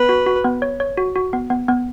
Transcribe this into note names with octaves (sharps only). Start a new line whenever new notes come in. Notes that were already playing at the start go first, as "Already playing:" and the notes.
Already playing: B3 B4
F#4
F#4
B3
C#5
C#5
F#4
F#4
B3
B3
B3